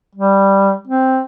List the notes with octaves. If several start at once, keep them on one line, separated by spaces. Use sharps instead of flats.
G3
C4